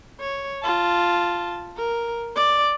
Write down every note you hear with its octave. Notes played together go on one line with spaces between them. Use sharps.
C#5
F4 A5
A#4
D5